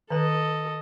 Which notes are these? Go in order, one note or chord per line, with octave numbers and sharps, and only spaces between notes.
D#3 A4 B4 D#5